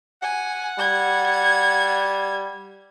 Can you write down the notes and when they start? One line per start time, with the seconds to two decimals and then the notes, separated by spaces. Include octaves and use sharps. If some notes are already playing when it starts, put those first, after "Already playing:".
0.22 F#5 G#5
0.79 G3 G#6